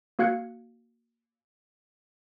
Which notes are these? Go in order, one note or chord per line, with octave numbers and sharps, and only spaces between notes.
A#3 F#4 F5 F#6 G#6 C#7